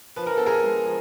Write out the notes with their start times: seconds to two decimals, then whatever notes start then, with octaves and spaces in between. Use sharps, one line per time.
0.16 F3 B4
0.26 A#4
0.37 B3 A4
0.46 G#4 A#4
0.63 G#3
0.86 F3